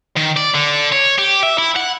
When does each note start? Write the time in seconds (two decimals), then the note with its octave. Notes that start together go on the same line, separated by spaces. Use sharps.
0.16 D#3
0.37 D5
0.55 D3
0.92 C#5
1.18 G4
1.43 E5
1.58 E4
1.76 F#5